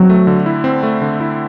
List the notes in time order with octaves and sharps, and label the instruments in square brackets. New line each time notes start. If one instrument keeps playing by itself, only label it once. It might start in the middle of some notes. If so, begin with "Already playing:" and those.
Already playing: [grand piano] F#3 [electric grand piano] C4
[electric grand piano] A3
D3
E4
C4
A3
D3
E4